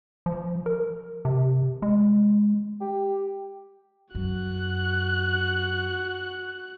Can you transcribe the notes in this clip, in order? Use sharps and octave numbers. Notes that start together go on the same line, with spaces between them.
F3
A#4
C3
G#3
G4
F#2 F#4 F#6